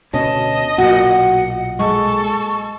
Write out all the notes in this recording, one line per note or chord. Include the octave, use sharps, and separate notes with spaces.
D2 B2 C#4 D#5 A5
B1 A#2 F#4 F#5
G#3 A4 C#6